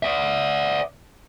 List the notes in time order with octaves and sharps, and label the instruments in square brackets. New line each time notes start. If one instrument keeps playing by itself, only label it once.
[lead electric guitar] D5 E5